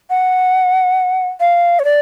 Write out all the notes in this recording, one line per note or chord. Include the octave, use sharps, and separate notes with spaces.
F#5
F5
C#5
D5